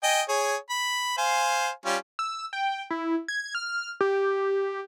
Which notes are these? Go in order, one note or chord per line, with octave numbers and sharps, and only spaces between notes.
D#5 G5 G#5
G#4 C#5
B5
C5 F5 G#5
G3 C#4 F4
E6
G5
E4
G#6
F6
G4